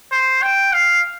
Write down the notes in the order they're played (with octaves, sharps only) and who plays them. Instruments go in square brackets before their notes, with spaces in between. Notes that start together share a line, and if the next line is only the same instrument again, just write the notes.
[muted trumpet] C5
G5
F5